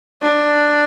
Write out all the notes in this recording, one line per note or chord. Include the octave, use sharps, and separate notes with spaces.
D4